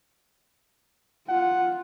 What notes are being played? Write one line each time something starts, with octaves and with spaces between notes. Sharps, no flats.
F4 F#5